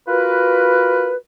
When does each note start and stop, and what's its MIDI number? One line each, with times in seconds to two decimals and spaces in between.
0.08 1.14 65
0.08 1.14 66
0.08 1.14 70
0.08 1.14 71